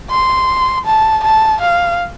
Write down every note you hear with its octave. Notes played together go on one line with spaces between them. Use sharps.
C6
A5
A5
F5